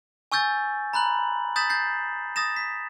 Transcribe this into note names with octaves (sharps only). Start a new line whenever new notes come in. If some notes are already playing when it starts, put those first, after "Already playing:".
G#5 C#6 E6 G6 A6
A#5 B5 F#6 F#7
D#6 G6 A6 B6 E7 F#7
G6 A6 C7
D#6 A6 A#6 E7
B6